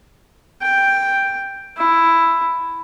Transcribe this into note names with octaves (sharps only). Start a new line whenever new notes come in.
G5
E4